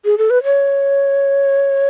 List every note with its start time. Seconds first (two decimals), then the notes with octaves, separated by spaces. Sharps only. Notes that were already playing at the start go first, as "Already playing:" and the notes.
0.05 G#4
0.18 A4
0.30 B4
0.44 C#5